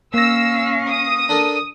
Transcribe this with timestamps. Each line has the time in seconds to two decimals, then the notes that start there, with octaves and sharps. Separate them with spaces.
0.14 A#3 C#4 F5 E6 A#6
0.89 D#6
1.29 D4 A4 A#4